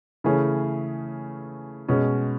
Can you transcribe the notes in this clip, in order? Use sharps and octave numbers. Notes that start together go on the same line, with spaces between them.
C#3 E3 A3 C#4 G#4
B2 G#3 C#4